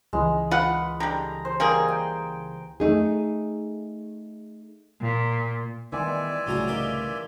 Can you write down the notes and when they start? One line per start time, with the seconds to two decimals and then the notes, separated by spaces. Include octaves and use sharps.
0.13 C#2 E3 G#3
0.51 F4 B4 F#5
1.00 D3 G3 A#5
1.45 C5
1.60 G3 A#3 G#4
1.88 G5
2.80 A3 D#4 G#4
5.01 A#2
5.92 D#3 E3 G3 G#3 B3 D5 E5 G#5
6.46 C2 A2 C#3 F#3 F4 A#5
6.68 D#3 G4 F5